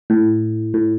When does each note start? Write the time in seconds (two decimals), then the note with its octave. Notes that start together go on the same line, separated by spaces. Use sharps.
0.10 A2
0.74 A2